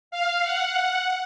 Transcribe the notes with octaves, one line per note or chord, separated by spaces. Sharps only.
F5
F#5